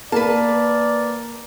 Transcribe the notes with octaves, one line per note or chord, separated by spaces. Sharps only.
A#3 B4 D5 A5